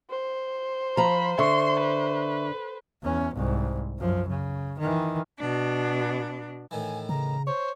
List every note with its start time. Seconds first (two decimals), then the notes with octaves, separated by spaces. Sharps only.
0.10 C5
0.97 F3 A#5 B5
1.39 D3 E5 C6 C#6
1.80 B4
3.03 E2 C#4
3.34 C2 G#2
3.99 F#2 F3
4.28 C#3
4.79 D#3 E3
5.37 B2 D4
6.71 A2 D#3 E3 G#5
7.09 C#3 A#5
7.47 C5 C#5